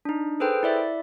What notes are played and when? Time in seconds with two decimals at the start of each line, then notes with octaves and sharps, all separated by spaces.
0.05 D4 D#4
0.40 G#4 A4 B4 C5 G5
0.63 E4 D5 E5